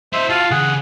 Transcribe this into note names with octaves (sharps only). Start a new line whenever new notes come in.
E4 C5 D#5 E5 C6
F4 F#4 F5 A5
C#3 G#4 A4 F#5